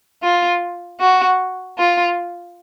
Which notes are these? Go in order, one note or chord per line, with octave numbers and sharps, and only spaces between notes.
F4
F#4
F4